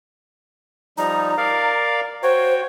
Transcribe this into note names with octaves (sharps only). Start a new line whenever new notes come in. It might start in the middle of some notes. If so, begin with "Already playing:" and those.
F3 G3 D#4 A#5
A#4 D5 F5
F#4 C5 C#5 G5